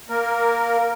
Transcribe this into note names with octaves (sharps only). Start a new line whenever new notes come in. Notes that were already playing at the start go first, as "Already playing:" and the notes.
A#3 A#4